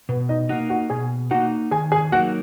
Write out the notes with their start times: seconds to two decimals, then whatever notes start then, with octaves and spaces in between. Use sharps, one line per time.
0.09 B2 B3 B4
0.29 D#4 D#5
0.49 A#3 D#4 F#4 F#5
0.69 F#4 F#5
0.90 B2 G#4 G#5
1.31 A#3 D#4 F#4 F#5
1.71 D#3 G#4 G#5
1.92 G#4 G#5
2.12 F#3 A#3 D#4 F#4 A#4 F#5